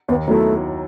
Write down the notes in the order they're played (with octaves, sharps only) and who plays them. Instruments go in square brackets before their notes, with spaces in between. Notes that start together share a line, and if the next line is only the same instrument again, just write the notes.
[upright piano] D#2 [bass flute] B3
[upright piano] D#3 F#3 B3 E4 [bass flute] A3